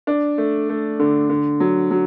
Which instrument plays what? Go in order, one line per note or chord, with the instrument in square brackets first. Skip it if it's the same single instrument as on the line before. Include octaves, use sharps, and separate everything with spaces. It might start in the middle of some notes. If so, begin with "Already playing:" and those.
[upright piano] D4
A3
A3
D3
D3
F#3
F#3